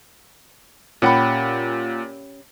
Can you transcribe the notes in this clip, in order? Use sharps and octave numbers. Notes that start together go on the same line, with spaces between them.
A#2 C#4 G4 F#5 B5 C#7